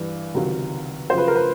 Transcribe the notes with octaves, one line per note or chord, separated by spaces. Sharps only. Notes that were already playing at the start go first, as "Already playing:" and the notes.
Already playing: G2 E3
C#2 C3 D#3 F#3
F#2 C#3 F3 C5
B4
A#4
B4